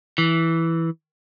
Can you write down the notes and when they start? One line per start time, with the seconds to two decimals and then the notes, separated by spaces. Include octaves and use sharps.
0.18 E3